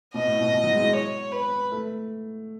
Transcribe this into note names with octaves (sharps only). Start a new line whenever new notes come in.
B2 D#5
A2
B2
B2
F#3
G#3
G#3
C#5
B4
A3